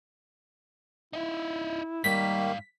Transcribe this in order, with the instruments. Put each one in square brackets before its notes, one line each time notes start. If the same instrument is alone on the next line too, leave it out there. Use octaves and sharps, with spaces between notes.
[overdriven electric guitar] D#4 E5 [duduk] E4
[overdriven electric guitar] G#2 F5 [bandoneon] D#3 A#3 [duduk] G3 [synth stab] B6